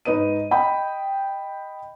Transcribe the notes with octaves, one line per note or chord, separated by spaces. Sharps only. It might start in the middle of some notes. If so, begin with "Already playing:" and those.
G#2 D#4 B4 D#5 D#7
D#5 G5 B5